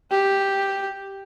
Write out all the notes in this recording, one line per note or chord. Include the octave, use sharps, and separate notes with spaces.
G4